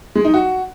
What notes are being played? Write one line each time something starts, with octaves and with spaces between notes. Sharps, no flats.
G#3
D#4
F#4